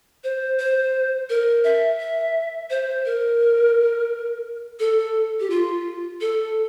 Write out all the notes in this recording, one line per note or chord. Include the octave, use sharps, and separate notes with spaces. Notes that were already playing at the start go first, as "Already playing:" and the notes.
C5
C5
A#4
E5
E5
C5
A#4
A4
G4
F4
A4